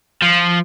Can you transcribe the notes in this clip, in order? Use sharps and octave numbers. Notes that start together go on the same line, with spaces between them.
F3